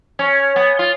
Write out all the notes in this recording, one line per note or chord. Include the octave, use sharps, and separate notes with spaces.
C#4
B3
F4